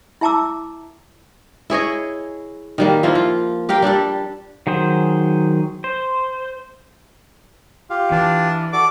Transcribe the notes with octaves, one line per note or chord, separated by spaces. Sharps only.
E4 E5 A5 A#5 D6 E6
E4 G#4 C#5 D#5
D#3 G3 A#3
F3 A#3 E4 F4
F4
G4 A#4 F5 G5
G3 D4 G4 A4
D#3 F#3 G#4 C5
C5
F4 G4 F5
E3 D4
F#4 A4 D5 D6